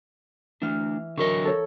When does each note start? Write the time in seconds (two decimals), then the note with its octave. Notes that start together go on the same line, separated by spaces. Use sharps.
0.62 E3 A3 D4 F6
1.17 D3 F#3 A#4 D#5 C#6
1.45 A4 C#5